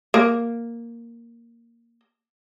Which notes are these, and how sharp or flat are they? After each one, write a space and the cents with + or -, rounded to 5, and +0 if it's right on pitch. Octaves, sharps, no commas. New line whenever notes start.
A#3 +0